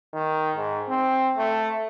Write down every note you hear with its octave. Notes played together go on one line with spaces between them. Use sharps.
D#3
G#2
C4
A3